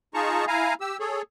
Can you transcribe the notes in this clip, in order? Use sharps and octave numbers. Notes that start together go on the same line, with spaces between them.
D#4 F4 G#4 A5 A#5 C#6
E4 F5 G#5 A#5
G4 E6
G#4 A4 C#5